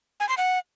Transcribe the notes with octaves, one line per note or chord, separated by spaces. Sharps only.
G#5
C6
F#5